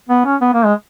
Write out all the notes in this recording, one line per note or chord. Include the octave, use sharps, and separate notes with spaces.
B3
C#4
B3
A#3
G#3